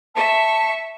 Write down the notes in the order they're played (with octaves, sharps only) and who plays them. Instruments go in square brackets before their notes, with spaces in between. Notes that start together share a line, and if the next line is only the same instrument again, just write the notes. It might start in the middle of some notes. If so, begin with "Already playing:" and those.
[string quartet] E5 C#6 [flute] A5